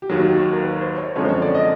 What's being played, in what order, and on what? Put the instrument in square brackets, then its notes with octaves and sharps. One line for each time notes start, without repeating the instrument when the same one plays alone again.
[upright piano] G4
[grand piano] D#2 D#3 F#3 [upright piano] F#4
[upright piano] A#4
B4
C5
C#5
[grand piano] F#2 D3 F3 G#3 C4 [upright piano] C#5
[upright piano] C5
C#5
D5
D#5